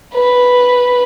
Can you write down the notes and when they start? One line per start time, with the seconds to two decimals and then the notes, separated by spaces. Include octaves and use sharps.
0.14 B4